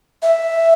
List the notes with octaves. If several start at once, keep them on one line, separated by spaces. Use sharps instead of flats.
E5